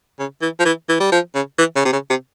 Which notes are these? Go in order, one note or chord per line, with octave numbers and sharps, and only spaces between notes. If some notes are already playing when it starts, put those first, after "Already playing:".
C#3
E3
F3
E3
E3
G3
F3
C#3
E3
C#3
C3
C#3
C3